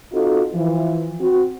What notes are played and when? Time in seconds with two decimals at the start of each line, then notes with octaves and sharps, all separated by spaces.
0.12 C4 D#4 F4 F#4 A4
0.54 E3 F3
1.20 C4 F#4